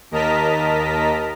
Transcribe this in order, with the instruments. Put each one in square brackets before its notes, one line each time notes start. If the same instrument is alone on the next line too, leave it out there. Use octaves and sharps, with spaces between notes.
[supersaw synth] D#2 A#4 D#5 A5 A#5 B6